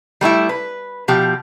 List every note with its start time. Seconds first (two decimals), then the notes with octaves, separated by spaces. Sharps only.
0.21 G3 A3 D#4 E4
0.49 B4
1.08 B2 F3 G4